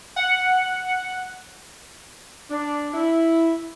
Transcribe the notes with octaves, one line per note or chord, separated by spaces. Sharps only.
F#5
D4
E4